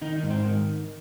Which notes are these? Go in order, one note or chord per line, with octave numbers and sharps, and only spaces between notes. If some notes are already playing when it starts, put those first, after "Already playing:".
D#3 D#4
D#4
G#2
C4
D#3